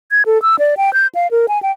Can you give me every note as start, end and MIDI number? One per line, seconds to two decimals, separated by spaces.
0.11 0.23 92
0.26 0.41 69
0.42 0.56 88
0.59 0.75 74
0.77 0.93 79
0.93 1.07 91
1.15 1.27 77
1.31 1.46 70
1.48 1.61 80
1.62 1.72 79